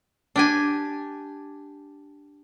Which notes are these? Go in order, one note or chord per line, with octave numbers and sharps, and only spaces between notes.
D4 G4 G#5